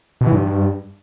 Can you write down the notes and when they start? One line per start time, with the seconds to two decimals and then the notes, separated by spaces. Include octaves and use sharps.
0.21 B2
0.26 E3
0.32 G2